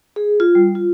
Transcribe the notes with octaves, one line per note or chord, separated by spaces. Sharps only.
G#4
F4
G3
F4